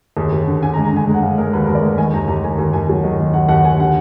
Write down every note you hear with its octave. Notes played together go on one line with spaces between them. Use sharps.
D#2 G#4
D#2
D3
D3 G#5
A#5
G#3
A#5
D3 G#5
G#3
F#5
G#3 F5
G#3 A#4
D#2 B4
D#2 A#4
D5
G#3 B4
D#3 G#5
D#2 A#5
D#2 A#5
D#3 G#5
D#2 G#5
D#2 G#5
F#3
D#3
D#3
D#2 F#5
D#2 F#5
D#2 G#5
D3 F#5